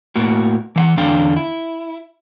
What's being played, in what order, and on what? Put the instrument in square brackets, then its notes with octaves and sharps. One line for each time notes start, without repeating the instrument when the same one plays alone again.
[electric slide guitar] A2 A#3 F#4
E3 F5 F#5
E2 D3 D4 F5 G5
E4